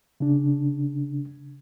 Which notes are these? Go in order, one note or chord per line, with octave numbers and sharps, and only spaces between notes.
C#3 D4